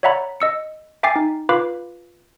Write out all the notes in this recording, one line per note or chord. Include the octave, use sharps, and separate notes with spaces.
C#5 D5 E5 F#5 A#5 B5
D#5 E6 C#7
E5 G5 G#5 D6 A6 C7
D#4
F4 B4 F5 B5 D6